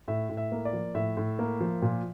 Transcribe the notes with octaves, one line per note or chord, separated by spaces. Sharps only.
A2 E5
A2
E5
A#3
D5
F3
A2 E5
A2
A#3
F3
A#2